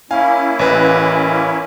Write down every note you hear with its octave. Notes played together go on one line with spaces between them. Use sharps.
A#3 C#4 E4 F5 G#5
A1 B4